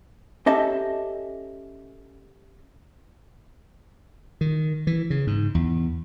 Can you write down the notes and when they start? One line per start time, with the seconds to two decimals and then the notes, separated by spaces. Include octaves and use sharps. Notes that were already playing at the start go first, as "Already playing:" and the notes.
0.46 C#4 G4 A4 D#5 E5 A5
4.41 D#3
4.87 E3
5.10 C#3
5.27 G#2
5.55 E2